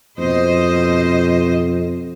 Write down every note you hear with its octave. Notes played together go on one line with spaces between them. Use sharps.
F2 B2 C5 D#5